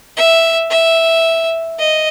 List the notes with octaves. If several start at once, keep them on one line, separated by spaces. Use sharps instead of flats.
E5
E5
D#5